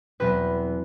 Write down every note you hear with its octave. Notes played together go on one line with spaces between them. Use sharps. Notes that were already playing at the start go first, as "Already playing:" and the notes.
E2 B2 F#3 C4 B4